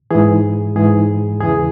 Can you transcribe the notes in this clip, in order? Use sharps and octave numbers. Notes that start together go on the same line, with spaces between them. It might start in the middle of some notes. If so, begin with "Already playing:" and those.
G#2 E3 G#4
G#2 E3 G#4
E2 C#3 E3 G#4